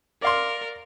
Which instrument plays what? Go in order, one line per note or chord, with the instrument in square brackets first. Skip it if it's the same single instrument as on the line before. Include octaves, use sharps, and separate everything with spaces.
[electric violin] A#4 [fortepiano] D5 F5 C6